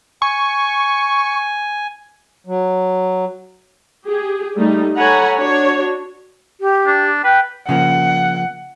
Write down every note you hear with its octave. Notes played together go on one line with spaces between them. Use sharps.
G#5 C#6
F#3
G4 G#4
G3 A3 D#4
A4 C#5 F#5 G#5 A#5 B5
D4 F#4 C#5
G4
D4
B4 G5
C#3 F3 A#3 F#5